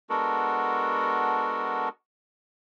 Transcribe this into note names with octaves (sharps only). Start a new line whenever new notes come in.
G#3 B3 D4 F#4 A4 A#4